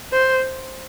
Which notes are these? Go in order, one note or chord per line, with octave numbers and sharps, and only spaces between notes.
C5